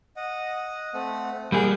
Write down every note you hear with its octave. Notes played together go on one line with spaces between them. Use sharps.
D#5 F#5
A3 C4 F#5
G3 A#3 G#4 F#5 G6